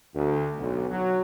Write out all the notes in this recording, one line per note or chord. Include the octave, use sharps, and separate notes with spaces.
D2
B1
F#3